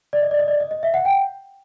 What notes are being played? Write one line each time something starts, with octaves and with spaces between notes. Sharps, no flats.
D5
D#5
D5
D#5
D5
D#5
D#5
E5
F#5
G5